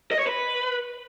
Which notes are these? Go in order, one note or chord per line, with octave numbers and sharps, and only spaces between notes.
D#5
C#5
B4